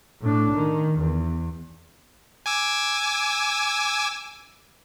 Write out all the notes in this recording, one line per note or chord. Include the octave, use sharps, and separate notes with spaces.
A2 D4
D#3
E2
G#5 D6 E6